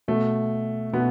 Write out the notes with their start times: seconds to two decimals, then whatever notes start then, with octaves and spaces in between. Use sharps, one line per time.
0.08 B2 A3
0.93 B2 B3